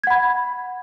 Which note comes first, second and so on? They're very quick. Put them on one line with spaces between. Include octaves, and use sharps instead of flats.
G#6 F#5 B5